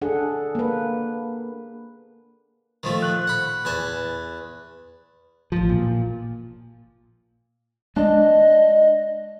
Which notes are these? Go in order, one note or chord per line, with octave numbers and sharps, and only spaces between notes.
D4 G#4 A4 F#5
A#3 B4
D#3 F3 A3
F#6 F#7
F#5 B5
E2 G#5 A5
A1 F3
A#2
G#3 D4 D#5